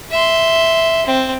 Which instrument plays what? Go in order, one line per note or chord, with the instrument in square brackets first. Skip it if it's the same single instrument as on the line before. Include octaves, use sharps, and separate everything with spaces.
[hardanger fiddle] E5 C6
C4